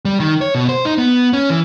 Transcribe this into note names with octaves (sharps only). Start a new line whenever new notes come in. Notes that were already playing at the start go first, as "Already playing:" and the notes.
G3
D#3
C#5
B2
C5
D#4
B3
C#4
E3